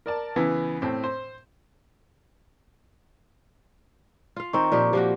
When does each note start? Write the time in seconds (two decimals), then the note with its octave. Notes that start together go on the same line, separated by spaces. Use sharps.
0.06 A#4 D5 A5
0.36 C#3 E3 B3
0.82 A2 C4
1.04 C5
4.36 F4 F5
4.53 D#3 C4 A#5 C#6
4.72 A#2 F3 G4
4.93 F3 A#3 F#4 G4